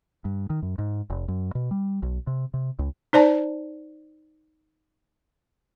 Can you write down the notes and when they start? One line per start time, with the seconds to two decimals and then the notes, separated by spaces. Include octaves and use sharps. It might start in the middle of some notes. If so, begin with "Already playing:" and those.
0.25 G2
0.50 D#3
0.62 F#2
0.78 G#2
1.10 F1
1.28 F#2
1.55 B2
1.71 G3
2.02 B1
2.27 C3
2.54 C3
2.79 C#2
3.13 D#4 C5 D5 A5